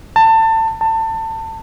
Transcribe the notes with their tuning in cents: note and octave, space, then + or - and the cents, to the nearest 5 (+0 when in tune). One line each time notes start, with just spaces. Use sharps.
A5 +25
A5 +25